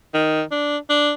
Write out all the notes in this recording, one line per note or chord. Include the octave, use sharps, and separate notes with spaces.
D#3
D4
D4